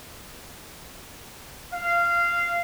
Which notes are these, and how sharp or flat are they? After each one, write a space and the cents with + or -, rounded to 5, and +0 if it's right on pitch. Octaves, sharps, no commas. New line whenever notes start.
F5 -15